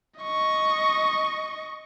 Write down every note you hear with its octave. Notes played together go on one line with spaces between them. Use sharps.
D#5 C#6